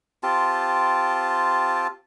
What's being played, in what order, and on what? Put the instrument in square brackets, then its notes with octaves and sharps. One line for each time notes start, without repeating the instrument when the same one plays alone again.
[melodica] C4 F4 G4 A5